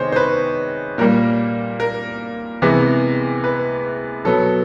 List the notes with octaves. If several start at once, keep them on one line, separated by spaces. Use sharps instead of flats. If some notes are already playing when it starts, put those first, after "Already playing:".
Already playing: C3 D#3 G#3 B3 C5 C#5 D#5
C5
B4
A#2 G3 A#3 A#4
A#4
C3 E3 G#3 B3
B4
B2 F#3 B3 A4